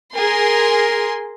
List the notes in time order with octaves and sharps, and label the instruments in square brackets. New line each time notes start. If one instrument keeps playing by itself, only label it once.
[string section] G#4 A#4 C6